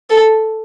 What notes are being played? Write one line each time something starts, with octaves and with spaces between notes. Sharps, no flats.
A4